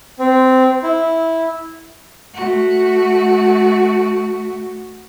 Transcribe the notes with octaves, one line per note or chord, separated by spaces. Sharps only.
C4
E4
A3 F#4